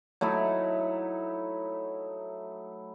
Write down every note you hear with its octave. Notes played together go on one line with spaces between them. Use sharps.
F#3 A3 D#4 E4